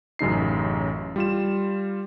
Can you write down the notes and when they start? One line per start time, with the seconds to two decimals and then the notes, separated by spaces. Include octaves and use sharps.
0.19 A1 F#2 C#3 D#4 C7
1.16 G3 F4 E7